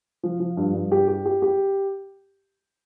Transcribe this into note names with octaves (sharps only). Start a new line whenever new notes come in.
F3
F3
G2
G2
G4
G4
G4
G4